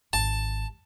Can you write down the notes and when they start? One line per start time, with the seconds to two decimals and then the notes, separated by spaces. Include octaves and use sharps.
0.13 G#1 A5